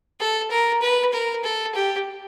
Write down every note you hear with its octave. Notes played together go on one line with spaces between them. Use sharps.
A4
A#4
B4
A#4
A4
G4